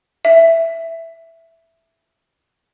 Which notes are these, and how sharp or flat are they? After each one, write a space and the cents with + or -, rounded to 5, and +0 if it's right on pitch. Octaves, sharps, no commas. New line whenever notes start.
E5 +0